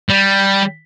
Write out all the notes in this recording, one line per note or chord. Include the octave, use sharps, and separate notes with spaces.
G3